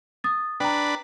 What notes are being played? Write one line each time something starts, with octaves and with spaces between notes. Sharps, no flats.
D#6 A6
D4 B4 G5 A#5